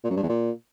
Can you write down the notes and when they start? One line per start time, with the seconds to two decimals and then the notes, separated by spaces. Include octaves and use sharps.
0.04 A#2
0.10 F#2
0.16 G2
0.23 E2
0.29 A#2